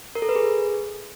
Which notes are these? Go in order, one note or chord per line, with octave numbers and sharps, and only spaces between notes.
A#4
A4
B4
G#4